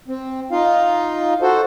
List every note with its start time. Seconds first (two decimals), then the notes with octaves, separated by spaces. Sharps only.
0.08 C4
0.52 D#4 F4 F5
1.42 F#4 A4 C5